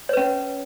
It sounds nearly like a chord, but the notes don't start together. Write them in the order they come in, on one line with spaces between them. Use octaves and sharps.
C#5 B4 C#4